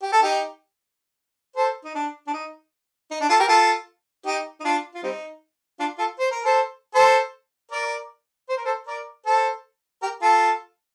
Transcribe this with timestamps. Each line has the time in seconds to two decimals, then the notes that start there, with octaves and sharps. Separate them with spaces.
0.02 G4
0.12 A4
0.21 D#4 G4
1.56 A4 C5
1.85 D#4
1.95 D4
2.27 D4
2.33 D#4
3.11 D#4
3.21 D4
3.29 F4 A4
3.40 G4 A#4
3.49 F4 A4
4.26 D#4 G4
4.60 D#4
4.65 D4 F4
4.95 F4
5.03 G3 C4 D#4
5.80 D4 F4
5.99 F4 A4
6.19 C5
6.31 A#4
6.45 A4 C5
6.95 A4 C5
7.72 A#4 D5
8.49 C5
8.57 A#4
8.65 A4 C5
8.87 A#4 D5
9.26 A4 C5
10.02 G4 A#4
10.22 F4 A4